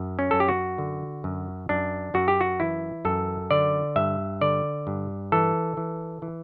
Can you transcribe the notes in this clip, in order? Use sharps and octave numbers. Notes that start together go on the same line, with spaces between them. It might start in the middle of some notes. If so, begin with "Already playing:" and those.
Already playing: F#2
C#4
F#2 A4
G4
F#4
D3
F#2
F#2 D4
F#2 F#4
G4
F#4
E3 E4
F#2 A4
D3 D5
G2 E5
D3 D5
G2
E3 A4
E3
E3